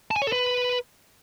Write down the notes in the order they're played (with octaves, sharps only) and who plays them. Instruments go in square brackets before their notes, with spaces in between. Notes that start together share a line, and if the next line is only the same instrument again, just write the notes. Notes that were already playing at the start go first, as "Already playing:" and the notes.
[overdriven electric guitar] A5
G#5
C#5
A4
B4